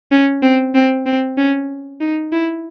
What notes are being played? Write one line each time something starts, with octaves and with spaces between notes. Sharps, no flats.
C#4
C4
C4
C4
C#4
D#4
E4